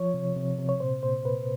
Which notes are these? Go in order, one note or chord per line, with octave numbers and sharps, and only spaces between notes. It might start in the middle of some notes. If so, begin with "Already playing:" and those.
Already playing: F3 C#5
C3
C3
C3
C#5
A#2 C5
A#2 C5
A#2 B4